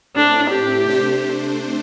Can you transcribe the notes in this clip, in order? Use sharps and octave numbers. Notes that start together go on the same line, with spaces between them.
A2 A3 C4 D4
G4
C3 A3 D4 C5